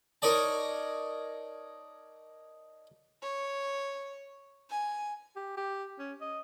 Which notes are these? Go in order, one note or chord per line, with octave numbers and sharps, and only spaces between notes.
D#4 A#4 C#5 D5 A5
C#5
G#5
G4
G4
C#4
D#5